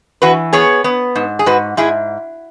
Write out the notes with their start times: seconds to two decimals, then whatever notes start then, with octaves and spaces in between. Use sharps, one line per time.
0.22 E3 F#4 B4
0.53 B3 G#4 C#5
0.84 B3
1.16 G#2
1.39 G#4
1.46 G#2 F#4 B4
1.77 G#2 E4 G#4